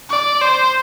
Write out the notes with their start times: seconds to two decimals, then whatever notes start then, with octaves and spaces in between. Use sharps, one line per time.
0.10 D5
0.41 C5